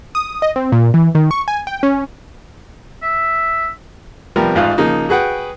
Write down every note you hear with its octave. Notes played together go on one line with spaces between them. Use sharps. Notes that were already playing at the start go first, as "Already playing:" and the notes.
D#6
D#5
C4
A#2
E3
D#3
C#6
G#5
G5
C#4
E5
C3 F3 G3 B3 A#4
A1 G#2 F4 F5 F#6
C#3 F3 A#3 D#4
F#4 G#4 B4 F#5 G5